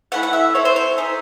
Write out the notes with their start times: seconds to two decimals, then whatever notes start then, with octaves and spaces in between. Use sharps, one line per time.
0.12 A3 C#4 E4 F#5
0.23 F#5
0.33 E5
0.55 C4 E4 A4 C#5
0.65 C5
0.76 C#5
0.98 D#4 G#4 E5